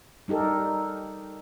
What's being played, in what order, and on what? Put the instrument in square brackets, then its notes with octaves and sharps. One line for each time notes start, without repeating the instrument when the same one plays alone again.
[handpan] G3 D#4 G4 A4 A#4